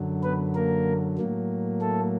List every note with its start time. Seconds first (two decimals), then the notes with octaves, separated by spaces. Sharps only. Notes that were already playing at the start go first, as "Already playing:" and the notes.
Already playing: F#2 D3 F#3
0.23 B3 B4
0.55 A#3 A#4
1.18 A2 F#3 A#3
1.81 A3 A4